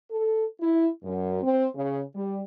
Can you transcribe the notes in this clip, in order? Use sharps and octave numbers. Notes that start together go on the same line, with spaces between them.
A4
E4
F#2
C4
C#3
G3